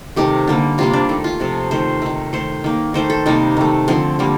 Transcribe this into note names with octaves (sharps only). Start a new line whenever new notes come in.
C3 D#3 A3 G4
D3 G3 A#3
C3 G3 A#3 F4
D4
D#3 A3
F4
C3 F3 A3
D#3 A3 C5
D#3 A3
D#3 A3 C5
D#3 A#3
D#3 A3 C5
A4
C3 G3 A#3 D#4
D#3 A3
D3 F3 A3 C4
D3 G3 A#3